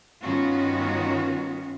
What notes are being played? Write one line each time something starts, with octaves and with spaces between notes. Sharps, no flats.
G2 D#3 B3 C#4 F4 F#4